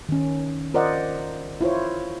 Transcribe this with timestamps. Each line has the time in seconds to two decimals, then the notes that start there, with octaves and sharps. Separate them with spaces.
0.09 D#3 C#4
0.74 F4 A#4 C5 D5 D#5 F#5
1.61 E4 F4 C5 C#5